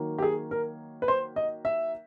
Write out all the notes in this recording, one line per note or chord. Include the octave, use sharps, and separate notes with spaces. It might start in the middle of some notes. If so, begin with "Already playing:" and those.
Already playing: D#3 F#3 A#3
G4
G#4
A#4
B4
C5
D#5
E5